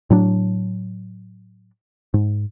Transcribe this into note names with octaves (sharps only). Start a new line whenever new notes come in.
A2 F#3 D4
G#2